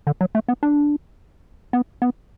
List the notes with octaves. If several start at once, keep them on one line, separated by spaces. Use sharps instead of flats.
D3
F#3
A3
B3
D4
B3
B3